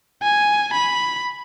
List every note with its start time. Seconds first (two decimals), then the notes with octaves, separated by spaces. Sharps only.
0.22 G#5
0.73 B5